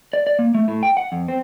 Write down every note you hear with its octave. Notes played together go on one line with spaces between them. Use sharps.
D5
D5
A#3
A3
A2
G5
F#5
F2
C4